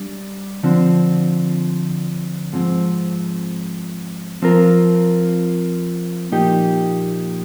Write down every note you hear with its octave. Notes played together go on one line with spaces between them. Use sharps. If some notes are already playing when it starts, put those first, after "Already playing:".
Already playing: G3 D4
D3 F3 C4
G#2 F3 C4
F3 C4 F4 A#4
A#2 F3 A#3 D#4 G4